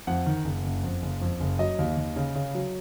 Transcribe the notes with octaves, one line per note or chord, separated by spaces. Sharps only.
F2 F#5
D#3
F#1
F#1
F2
F#1
F2
F#1
F#3 D#5
D#2
D#2
C#3
C#3
F#3